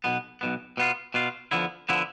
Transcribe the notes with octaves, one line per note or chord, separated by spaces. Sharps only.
B1 B2 B3
B1 B2 B3
B2 B3 F4
B2 B3 F4
F2 D3 F3 B3 E4
D3 F3 B3 E4